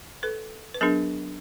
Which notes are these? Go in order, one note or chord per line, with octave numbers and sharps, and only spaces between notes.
A4 B4
B4
F#3 B3 D4 G#4 A#4